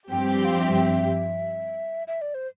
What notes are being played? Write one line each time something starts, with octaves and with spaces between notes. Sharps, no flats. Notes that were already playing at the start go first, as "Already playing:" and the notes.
G2 F3 C4 G4 G5
G5
F5
E5
E5
D5
C5